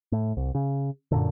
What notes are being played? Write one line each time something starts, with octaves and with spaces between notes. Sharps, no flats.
A2
C2
C#3
F#2 A#2 D3